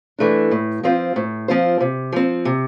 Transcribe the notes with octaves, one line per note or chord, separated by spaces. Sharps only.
E3 A3 D4
A2
F3 C4 F4 C5
A2
F3 C4 F4 C5
C3
F3 C4
C3